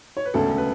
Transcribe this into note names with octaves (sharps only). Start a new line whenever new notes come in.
C#5
B4
E1 D2 C#3 A4
B4